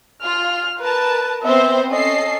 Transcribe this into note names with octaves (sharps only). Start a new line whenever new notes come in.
F4 F6
A#4 B4 A5
B3 C4 C5 E5
C#4 A4 D#5 C7